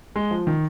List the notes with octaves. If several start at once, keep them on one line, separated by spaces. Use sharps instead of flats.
G#3
F3
D#3